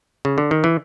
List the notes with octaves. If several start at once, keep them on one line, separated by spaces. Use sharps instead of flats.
C#3
D3
D#3
E3